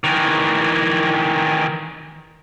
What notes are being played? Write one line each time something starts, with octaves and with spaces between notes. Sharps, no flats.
D#3 E3